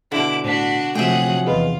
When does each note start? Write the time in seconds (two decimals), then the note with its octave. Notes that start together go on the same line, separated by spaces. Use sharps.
0.12 B2 D3 E4 D6
0.44 A2 D4 F#4 B6
0.95 C3 F3 F#3 A3 G#4 E5 F#5 G5
1.47 E2 F4 G#4 B4 D#5